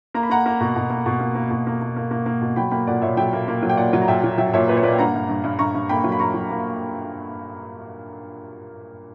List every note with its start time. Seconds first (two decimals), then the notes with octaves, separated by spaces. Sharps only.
0.14 A#3 A#5
0.23 B5
0.30 A#3 F#5 A#5
0.46 A#3
0.61 B2
0.76 B2
0.90 A#3
1.06 B2
1.20 A#3
1.35 A#3
1.50 B2
1.67 A#3
1.82 A#3
1.96 A#3
2.11 A#3
2.26 A#3
2.42 B2
2.56 F#3 G5 B5
2.71 A#3 G5 B5
2.87 A#2 D5 F#5
3.02 A#2 C#5 E5
3.17 F#3 E5 G5
3.33 A#3
3.48 A#3
3.63 F#3
3.69 G5
3.77 A#2 D5 F#5
3.93 F#3
4.02 A#5
4.08 A#2 E5 G5
4.24 F#3
4.38 F#3 E5 G5
4.53 A#2 C#5 E5
4.68 A#2 B4
4.77 C#5
4.83 A#3 B4 D5
4.93 G5
4.98 G2 F#5 A#5
5.14 G2
5.29 G2
5.44 G2
5.59 G2 A#5 C#6
5.75 G2
5.89 A#3 G5 B5
6.04 F#3
6.12 B5
6.19 A#3 A#5 C#6
6.34 F#3
6.50 A#3